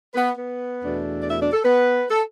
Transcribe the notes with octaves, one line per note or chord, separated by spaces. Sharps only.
B3 B4
B3 B4
E2 B2 A3 D4
D5
E4 E5
D4 D5
A4
B3 B4
A4